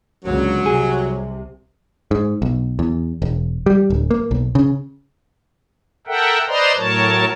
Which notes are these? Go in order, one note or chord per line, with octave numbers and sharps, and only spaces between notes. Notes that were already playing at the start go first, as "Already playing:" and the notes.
C#2 D3 F#3 A#3
C2 C3 G#4
G#2
B1
E2
E1
G3
D1
A#3
B1
C#3
A4 A#4 E5 F#5 G5
B4 C5 D5 D#5 A#5 C6
A2 F#3 A#4 C#5 A5